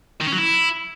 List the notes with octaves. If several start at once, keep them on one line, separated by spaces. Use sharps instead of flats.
D#3
C#4
F#3
E4